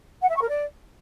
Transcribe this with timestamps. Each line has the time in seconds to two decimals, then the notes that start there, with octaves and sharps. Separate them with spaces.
0.22 F#5
0.28 E5
0.35 C#6
0.42 A#4
0.49 D5